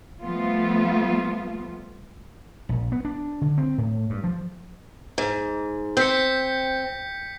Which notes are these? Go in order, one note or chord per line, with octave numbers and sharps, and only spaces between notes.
F3 G3 A3 B3 F4
A#1
B3
D4
D3
C4
A2
G2
F3
G#2
C4 G6 B6 C#7